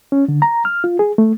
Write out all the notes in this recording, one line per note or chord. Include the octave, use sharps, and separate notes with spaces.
C#4
D3
A#5
F6
F4
G#4
A3